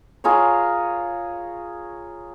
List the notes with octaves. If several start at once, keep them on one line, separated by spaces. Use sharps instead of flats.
F4 G#4 A#4 C#5